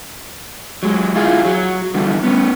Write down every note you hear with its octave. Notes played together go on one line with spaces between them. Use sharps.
F#3 G#3
E4 F4 G#4
F#3 F#4
D3 E3 G3
B3 C#4